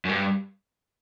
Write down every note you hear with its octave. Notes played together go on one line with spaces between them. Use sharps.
F#2
G2